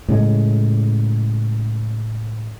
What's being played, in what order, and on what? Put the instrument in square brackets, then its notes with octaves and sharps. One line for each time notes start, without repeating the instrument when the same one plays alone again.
[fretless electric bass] A2 C#3 G#3